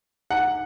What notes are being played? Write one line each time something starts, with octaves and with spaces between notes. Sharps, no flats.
F#5